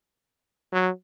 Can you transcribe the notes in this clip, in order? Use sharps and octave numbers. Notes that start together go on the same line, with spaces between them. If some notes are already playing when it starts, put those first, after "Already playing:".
F#3